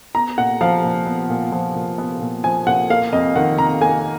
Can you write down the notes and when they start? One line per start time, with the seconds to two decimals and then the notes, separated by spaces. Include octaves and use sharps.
0.15 B3 A#5
0.38 A#2 F#5
0.61 F3 F5
0.84 A#2
1.06 B3
1.29 A#2
1.52 F3
1.75 A#2
1.98 B3
2.21 A#2
2.44 F3 G#5
2.67 A#2 F#5
2.90 A#3 F5
3.13 F2 D#5
3.36 D#3 F#5
3.58 F2 A#5
3.81 A#3 G#5